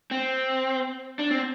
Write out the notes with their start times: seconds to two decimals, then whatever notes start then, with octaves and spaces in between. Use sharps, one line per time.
0.11 C4
1.19 D4
1.31 C4